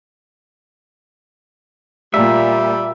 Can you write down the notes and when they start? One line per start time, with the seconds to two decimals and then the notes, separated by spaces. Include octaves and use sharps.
2.14 A#2 G3 E5